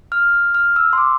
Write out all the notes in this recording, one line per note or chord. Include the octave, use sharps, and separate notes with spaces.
F6
F6
E6
C6
D6